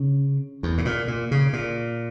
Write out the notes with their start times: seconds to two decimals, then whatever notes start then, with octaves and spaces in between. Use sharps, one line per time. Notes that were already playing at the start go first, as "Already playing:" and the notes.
Already playing: C#3
0.63 E2
0.78 A2
0.85 A#2
1.08 A#2
1.31 C#3
1.53 A#2